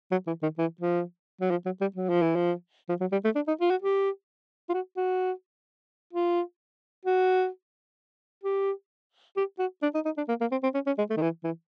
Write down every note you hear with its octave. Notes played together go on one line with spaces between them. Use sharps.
F#3
E3
D#3
E3
F3
F#3
F3
F#3
G3
F#3
F3
E3
F3
F3
F#3
G3
A3
D4
D#4
F4
F#4
G4
F4
F#4
F#4
F4
F#4
G4
G4
F#4
D4
D#4
D#4
D4
A#3
A#3
C4
C4
C#4
C#4
G#3
A3
D#3
E3
E3